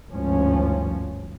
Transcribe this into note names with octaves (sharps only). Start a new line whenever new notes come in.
G#1 D2 G2 F3 C#4